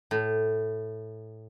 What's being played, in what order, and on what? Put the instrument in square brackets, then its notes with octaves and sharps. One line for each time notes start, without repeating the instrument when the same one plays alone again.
[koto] A2